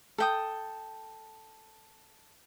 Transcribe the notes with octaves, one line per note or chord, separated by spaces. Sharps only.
A4 G5 D#6